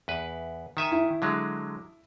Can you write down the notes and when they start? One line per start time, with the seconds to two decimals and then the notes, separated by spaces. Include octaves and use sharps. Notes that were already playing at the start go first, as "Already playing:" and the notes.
0.08 E2 B4
0.77 D#3 E5 G#5
0.92 E4
1.22 D3 F#3 G#3